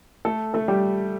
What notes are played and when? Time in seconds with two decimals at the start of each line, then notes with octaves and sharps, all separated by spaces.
0.25 A3 A4
0.54 A3 A4
0.68 G3 G4